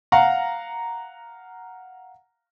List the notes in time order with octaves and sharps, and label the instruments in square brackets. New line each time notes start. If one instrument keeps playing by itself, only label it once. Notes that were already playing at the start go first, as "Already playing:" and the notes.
[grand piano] F5 F#5 A#5